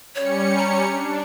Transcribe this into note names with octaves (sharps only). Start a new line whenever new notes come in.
G3 C#4 C#5 C#7
A#5
D4